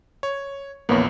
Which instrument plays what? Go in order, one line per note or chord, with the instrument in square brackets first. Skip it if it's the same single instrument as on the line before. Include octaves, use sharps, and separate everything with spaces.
[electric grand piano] C#5
[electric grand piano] A#1 E2 [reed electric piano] A#3 B3 C#5